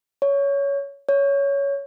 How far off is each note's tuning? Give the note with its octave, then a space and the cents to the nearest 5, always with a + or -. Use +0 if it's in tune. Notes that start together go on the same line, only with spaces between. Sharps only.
C#5 +15
C#5 +10